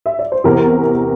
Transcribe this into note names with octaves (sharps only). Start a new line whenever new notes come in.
E5
D5
C5
E2 C3 E3 G4 A#4